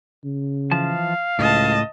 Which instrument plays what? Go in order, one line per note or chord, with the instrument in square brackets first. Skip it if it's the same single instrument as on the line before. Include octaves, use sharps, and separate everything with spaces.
[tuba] C#3
[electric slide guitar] E3 F3 A5 [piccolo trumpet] F5
[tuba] C#2 [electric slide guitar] A2 [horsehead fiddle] D#5 A5